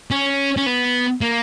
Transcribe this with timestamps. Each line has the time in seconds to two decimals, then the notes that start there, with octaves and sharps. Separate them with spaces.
0.11 C#4
0.57 C#4
0.66 B3
1.21 A#3